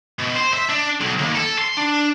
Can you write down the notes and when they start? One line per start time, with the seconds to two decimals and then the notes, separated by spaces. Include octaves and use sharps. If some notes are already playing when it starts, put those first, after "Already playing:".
0.19 B2
0.35 C5
0.53 E5
0.69 D4
1.00 B1
1.19 D#2
1.35 A4
1.58 C6
1.77 D4